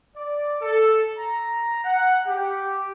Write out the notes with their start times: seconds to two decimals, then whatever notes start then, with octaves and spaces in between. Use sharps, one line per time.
0.16 D5
0.61 A4
1.17 A#5
1.84 F#5
2.27 G4